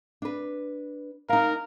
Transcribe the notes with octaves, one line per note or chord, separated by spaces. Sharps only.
D4 B4
D#4 A#4 F5